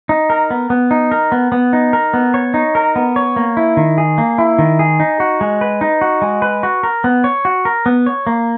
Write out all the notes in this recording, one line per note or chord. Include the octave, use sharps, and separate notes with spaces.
D#4
A#4
B3
B3
D#4
A#4
B3
B3
D#4
A#4
B3
C#5
D#4
A#4
B3
C#5
A#3
E4
D#3
G#4
A#3
E4
D#3
G#4
D#4
F#4
G#3
B4
D#4
F#4
G#3
B4
F#4
A#4
B3
C#5
F#4
A#4
B3
C#5
A#3